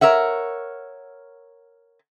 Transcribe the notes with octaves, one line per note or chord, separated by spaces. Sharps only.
A#4 C#5 E5 F#5